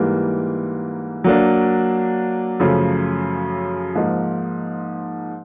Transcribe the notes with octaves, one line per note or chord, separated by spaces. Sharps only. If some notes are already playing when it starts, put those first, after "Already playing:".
Already playing: G#2 E3 G3 A#3
F#3 A#3 D4
F#2 C#3 F3 A3
G#2 F3 A#3 D#4